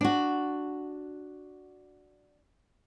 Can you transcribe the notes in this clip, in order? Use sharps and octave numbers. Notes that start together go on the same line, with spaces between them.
D4 F#4